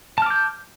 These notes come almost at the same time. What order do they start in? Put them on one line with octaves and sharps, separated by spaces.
A5 F6 D6 G6